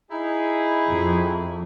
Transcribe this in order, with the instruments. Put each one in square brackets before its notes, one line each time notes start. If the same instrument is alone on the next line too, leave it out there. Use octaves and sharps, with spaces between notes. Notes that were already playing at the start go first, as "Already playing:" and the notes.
[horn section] D#4 E4 G#4
[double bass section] F2